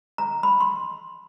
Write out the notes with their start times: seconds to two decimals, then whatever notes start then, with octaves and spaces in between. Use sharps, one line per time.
0.18 A#5
0.43 B5
0.60 C6